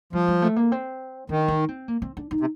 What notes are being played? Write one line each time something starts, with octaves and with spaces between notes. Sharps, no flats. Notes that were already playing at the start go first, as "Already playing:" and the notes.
F3 G3
G3
A3
A#3
C4
D#3 D4
D#4
C4
A#3
C4
D4
D#4
C3